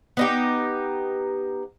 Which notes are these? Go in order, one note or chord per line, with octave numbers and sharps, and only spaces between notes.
B3 D#4 G4